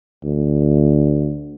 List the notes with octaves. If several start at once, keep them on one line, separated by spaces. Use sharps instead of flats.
D2